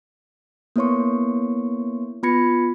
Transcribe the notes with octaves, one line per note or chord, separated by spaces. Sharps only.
A#3 B3 E4 C#5 C6 C#6
B3 F4 B5 G#6 A#6 C#7